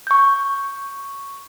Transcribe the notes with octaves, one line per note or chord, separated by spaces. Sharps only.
C#6 G6